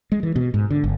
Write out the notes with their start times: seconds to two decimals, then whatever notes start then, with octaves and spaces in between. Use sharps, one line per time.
0.12 G#3
0.23 E3
0.36 B2
0.54 G#2
0.71 D3
0.84 G1